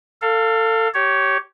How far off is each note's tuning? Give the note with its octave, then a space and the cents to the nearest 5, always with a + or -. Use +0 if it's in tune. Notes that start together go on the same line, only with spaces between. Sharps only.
A4 +30 F5 +0
G4 -20 C#5 +0